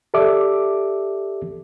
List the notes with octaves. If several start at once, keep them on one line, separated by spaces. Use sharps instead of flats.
G4 A4 D5 E5 D6